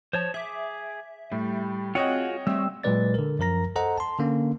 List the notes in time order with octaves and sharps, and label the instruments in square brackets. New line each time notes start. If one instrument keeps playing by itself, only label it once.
[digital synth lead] F3 [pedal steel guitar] C5 C#5 A5
[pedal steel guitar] G#4 D6 [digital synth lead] E5
[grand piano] A2 [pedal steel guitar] G3
[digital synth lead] C4 [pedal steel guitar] F4 F#4 G#4 [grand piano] C#5 D#5 G5 [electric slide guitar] F#5
[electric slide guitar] G3 C4 [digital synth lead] A3 [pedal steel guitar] E6
[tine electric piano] A#2 F#3 G#3 B4 D5 A6
D3 A#4
F#2 F3 A#4 A#5 A#6
A4 C5 D#5 F#5 A#5
A5 C6
D3 A#3 C#4